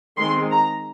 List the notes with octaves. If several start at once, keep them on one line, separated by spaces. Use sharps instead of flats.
D#3 G#3 C4 C6
A#5